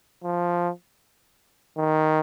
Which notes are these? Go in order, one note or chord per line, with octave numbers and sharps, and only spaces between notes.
F3
D#3